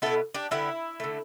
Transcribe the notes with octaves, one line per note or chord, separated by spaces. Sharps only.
B2 B3 E4 A4
D4 G4
D3 G3 B3 E4
D3 A3